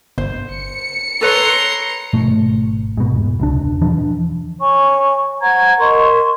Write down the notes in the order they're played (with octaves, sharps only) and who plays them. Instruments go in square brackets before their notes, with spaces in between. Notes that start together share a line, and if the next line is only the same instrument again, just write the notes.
[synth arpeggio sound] G1 [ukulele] C5
[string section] C#7
[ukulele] A4 B4 C#5 [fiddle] A#5 C6
[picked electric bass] G#1 B2 A3
G#2 B2
E1
E1 C#2 D4
E1 E3 F3 D4
[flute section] C#5 G#5 C#6
C5 F#5 A#5 G#6
A#4 D#5 C6 C#6